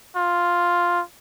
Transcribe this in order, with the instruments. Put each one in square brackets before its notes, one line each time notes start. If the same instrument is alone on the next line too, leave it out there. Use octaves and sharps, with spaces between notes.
[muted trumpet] F4